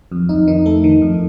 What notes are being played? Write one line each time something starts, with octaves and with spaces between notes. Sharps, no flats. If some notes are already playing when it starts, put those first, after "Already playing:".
F2
F2 D#4
D#3 D#4
A3 A4
D#3
F2